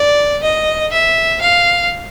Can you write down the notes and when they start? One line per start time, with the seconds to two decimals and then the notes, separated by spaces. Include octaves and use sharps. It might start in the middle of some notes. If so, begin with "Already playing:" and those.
Already playing: D5
0.43 D#5
0.92 E5
1.41 F5